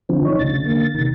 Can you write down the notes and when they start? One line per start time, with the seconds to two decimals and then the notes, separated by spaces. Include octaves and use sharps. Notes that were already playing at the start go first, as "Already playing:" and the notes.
0.09 D3 F3 C4
0.25 D#4 C#5
0.39 D2 C#3 A6
0.64 D3 A3 A#3
0.95 C3 D#3